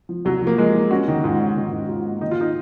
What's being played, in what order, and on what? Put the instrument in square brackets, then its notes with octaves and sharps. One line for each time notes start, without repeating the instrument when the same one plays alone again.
[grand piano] F3
[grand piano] C2 [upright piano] F#3
[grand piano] F3 [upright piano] A#3
[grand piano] F3 [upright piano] G#3
[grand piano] F3
[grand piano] C#4 [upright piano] F#4
[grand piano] D#3
[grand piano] G#2 [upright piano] F4
[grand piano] C#4
[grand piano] D#3 [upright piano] D#4
[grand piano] G#2
[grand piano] G#2 [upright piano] F4
[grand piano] A#3
[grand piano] D#3 [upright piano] D#4
[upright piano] F4
D#4